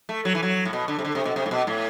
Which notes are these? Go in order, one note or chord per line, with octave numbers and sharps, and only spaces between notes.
A3
F#3
E3
F#3
A2
B2
D3
C3
D3
C3
B2
C3
A2
B2
A2